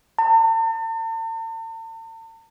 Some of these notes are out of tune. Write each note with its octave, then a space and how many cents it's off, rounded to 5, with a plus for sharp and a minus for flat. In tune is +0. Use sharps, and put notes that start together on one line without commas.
A5 +45